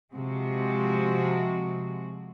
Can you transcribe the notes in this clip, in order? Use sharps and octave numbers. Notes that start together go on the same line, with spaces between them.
C3 F3 G#3 F#4